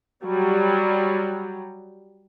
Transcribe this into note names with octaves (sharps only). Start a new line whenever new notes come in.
F#3 G3